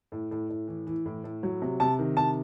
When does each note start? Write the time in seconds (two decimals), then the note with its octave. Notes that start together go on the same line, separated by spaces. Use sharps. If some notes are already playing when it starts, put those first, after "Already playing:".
0.12 A2
0.31 A2
0.49 A2
0.68 E3
0.87 E3
1.06 A2
1.24 A2
1.43 F#3
1.62 C3
1.80 C3 A5
1.99 D#3
2.17 C3 A5